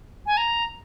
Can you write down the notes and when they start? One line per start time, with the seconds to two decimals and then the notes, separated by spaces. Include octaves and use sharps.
0.26 G#5
0.37 A#5